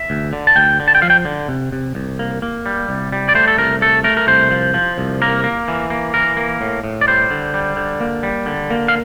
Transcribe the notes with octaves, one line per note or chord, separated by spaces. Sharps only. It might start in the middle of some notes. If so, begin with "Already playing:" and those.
Already playing: E5
D2
D3
A5
D2 G5
D3
A5
G5
F3 F5
G5
D3
C3
C3
C2
A#3
A#3
G3
C2
G3
D5
A3 C5
A4
C2 A#4
A3 A4
A3 A#4
A#4
C2 C5
F3
F3
C2
A#3 A#4
A#3
E3
A#3
E3 A#4
A#3
A2
A2
D5
G3 C5
D3
G3
D3
A#3
G3
D3
A#3
F5